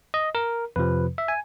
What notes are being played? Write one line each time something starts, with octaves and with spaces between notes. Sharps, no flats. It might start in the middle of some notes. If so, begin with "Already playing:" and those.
D#5
A#4
F2 C3 F3 B4
E5
G#5